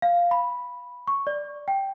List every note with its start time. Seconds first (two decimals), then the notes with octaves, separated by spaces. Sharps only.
0.02 F5
0.31 B5
1.07 C#6
1.27 D5
1.68 G5